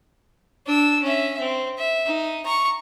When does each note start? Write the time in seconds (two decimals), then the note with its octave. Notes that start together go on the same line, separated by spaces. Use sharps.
0.66 D4 E6
1.03 C#4 E5
1.40 C4
1.78 E5
2.07 D#4
2.45 A#5 C#6